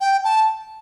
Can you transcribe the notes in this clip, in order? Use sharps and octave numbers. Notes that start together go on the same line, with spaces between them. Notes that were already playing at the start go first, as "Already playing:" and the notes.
G5
A5